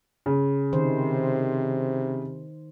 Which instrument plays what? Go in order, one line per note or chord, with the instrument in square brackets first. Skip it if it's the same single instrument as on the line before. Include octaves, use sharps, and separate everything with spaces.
[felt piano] C#3
[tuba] C3 [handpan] D#3 C5